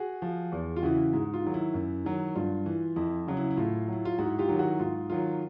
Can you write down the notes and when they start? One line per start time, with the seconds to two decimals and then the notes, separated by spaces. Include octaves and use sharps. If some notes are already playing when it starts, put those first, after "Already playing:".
Already playing: F#4 G#4
0.22 F3
0.52 E2
0.76 F4
0.83 C#3 E3 E4 F#4
1.13 G#2
1.34 F4
1.44 D#3 F#3
1.54 E4
1.74 F#2
2.05 D#3 F#3
2.35 G2 F4
2.66 E3
2.96 F2 E4
3.27 C#3 F#3
3.37 E4
3.51 E4
3.57 A2 F4
3.88 F#3 E4
4.05 F4
4.18 G#2 E4 F#4
4.39 F4 G4
4.49 D#3 F#3
4.59 E4 F#4
4.79 G#2 F4
5.10 D#3 F#3 F4